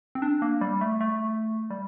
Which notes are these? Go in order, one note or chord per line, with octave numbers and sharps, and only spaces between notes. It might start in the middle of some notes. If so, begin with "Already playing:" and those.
C4
D4
A#3
G3
A3
A3
G3